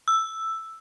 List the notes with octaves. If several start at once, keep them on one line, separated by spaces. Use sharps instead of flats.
E6